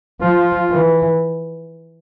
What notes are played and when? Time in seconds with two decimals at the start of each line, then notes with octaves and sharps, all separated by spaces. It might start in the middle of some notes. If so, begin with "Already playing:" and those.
0.21 F3 F4
0.71 E3